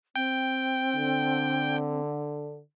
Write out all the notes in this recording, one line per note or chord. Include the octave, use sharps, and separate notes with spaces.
C4 G5
D3